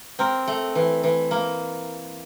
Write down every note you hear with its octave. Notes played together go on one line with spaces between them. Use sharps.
C4 A#4
A3
E3
E3
A#3